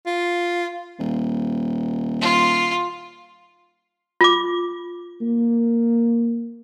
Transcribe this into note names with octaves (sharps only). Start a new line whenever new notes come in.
F4
D#1
F4
F4 D6
A#3